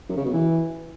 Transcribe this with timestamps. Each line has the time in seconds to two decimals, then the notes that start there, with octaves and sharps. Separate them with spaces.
0.09 F#2
0.17 C#3
0.25 B2
0.33 E3